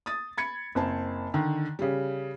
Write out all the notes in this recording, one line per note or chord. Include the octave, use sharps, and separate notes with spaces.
D#6 A6
B5 G#6 C#7
F#1 C4 A5
D3 D#3
C#3 G3